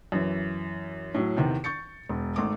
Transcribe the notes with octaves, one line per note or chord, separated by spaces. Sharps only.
F#2 E3
A2 F#3
E2 C3 D#3
C#6 G6 A6 C#7
E1
G#1 A3 D6